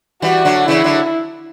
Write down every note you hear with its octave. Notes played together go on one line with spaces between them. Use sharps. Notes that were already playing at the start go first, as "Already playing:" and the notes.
E3 G3 F#4
D3 F#3
C#3 E3 E4
D3 F#3